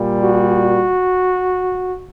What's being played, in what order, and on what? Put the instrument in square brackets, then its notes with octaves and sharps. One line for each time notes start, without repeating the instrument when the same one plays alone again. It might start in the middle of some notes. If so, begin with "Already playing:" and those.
Already playing: [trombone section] A#2 G3
F#4